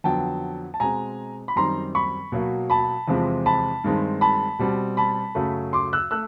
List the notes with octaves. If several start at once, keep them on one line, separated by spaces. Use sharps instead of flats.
F2 D3 F#3 B3 G5 A5
A5
B2 G#3 C4 G#5 A#5
B5
F#2 D#3 G3 C4 A#5 C6
B5 C#6
B2 F#3 A#3
A5 B5
E2 C3 F3 G#3 C4
A5 B5
G2 D#3 G#3 C4
A5 B5
B2 G3 C4
A5 B5
F#2 C#3 F#3 A3
C6 D6
E6 F#6
A3 E6 F#6